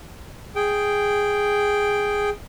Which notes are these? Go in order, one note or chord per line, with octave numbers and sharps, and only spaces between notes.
G#4 G5